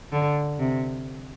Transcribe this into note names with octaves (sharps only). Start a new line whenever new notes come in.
D3
C3